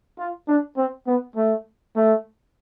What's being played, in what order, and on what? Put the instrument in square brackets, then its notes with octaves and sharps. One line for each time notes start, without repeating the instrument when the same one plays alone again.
[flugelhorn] F4
D4
C4
B3
A3
A3